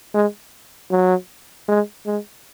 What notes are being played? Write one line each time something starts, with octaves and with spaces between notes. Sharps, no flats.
G#3
F#3
G#3
G#3